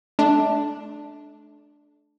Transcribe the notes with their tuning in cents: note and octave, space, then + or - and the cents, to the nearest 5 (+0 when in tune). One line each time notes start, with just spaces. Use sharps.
A3 -35 D4 +5